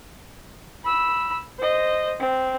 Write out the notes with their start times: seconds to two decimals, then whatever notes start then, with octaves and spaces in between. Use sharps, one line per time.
0.84 B5 E6
1.59 C5 D#5
2.20 C4